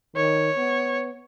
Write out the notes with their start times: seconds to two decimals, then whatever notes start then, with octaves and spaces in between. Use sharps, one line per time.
0.16 D#3 C#5
0.56 B3